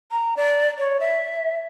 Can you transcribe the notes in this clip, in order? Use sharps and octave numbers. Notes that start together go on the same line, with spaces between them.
A#5
D5
C#5
E5